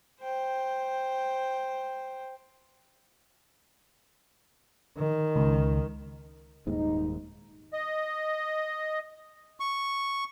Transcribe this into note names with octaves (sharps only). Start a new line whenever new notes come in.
C5 G5
D#3
C#2
D#1 D#2 G#2 D#4
D#5
C#6